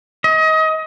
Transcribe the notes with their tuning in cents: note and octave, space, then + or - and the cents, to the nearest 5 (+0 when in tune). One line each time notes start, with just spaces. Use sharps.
D#5 +30